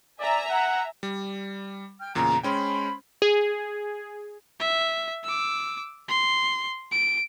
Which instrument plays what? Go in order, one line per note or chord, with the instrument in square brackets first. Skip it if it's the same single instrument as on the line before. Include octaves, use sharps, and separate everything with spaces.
[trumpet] D5 [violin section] E5 G#5 A#5
[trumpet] F#5
[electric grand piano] G3
[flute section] G5 F6
[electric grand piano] E2 A#2 C#3 [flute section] A#5
[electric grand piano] G#3 C#4 G5 [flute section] C5 B5
[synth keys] G#4
[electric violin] E5
D6 E6
C6
D7